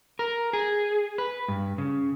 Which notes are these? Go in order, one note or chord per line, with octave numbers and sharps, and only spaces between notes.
A#4
G#4
B4
G2
C#3